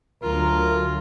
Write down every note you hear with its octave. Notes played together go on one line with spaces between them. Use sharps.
D2 F#3 F4 A#4